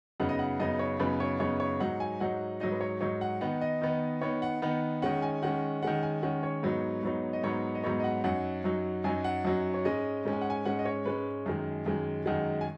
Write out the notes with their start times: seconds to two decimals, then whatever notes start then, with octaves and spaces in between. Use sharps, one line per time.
0.20 F#2 C#3 B3 D#4 F#5
0.29 D#5
0.39 F#5
0.60 F#2 C#3 B3 D#4 D#5
0.79 C#5
1.00 F#2 C#3 B3 D#4 B4
1.20 C#5
1.40 F#2 C#3 B3 D#4 C#5
1.60 C#5
1.80 G#2 F#3 D#4 F#5
2.00 G#5
2.20 G#2 F#3 D#4 F#5
2.60 G#2 F#3 D#4 D#5
2.72 B4
2.81 C#5
3.01 G#2 F#3 D#4 C#5
3.21 F#5
3.41 D#3 B3 D#4 F#5
3.61 D#5
3.81 D#3 B3 D#4
4.21 D#3 B3 D#4 C#5
4.42 F#5
4.62 D#3 B3 D#4 F#5
5.02 D#3 G#3 C#4 F#5
5.22 G#5
5.42 D#3 G#3 C#4 F#5
5.83 D#3 G#3 C#4 F#5
6.03 G#5
6.23 D#3 G#3 C#4 F#5
6.43 C#5
6.63 G#2 F#3 B3 D#4
7.03 G#2 F#3 B3 D#4
7.33 D#5
7.43 G#2 F#3 B3 D#4 C#5
7.75 D#5
7.84 G#2 F#3 B3 D#4 C#5
8.00 D#5
8.04 F#5
8.24 F#2 F#3 D#4 F#5
8.64 F#2 F#3 D#4
9.04 F#2 F#3 D#4 G#5
9.24 F#5
9.45 F#2 F#3 D#4
9.74 C#5
9.85 G#2 G#3 C#4 D#5
10.25 G#2 G#3 C#4
10.33 G#5
10.41 F#5
10.50 G#5
10.66 G#2 G#3 C#4 F#5
10.79 D#5
10.85 C#5
11.05 G#2 G#3 C#4 B4
11.46 F#2 D#3 G#3
11.86 F#2 D#3 G#3
12.26 F#2 D#3 G#3 F#5
12.61 G#5